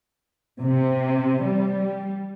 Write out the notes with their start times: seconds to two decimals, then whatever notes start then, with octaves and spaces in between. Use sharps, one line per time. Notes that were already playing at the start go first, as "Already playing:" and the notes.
0.60 C3
1.41 G3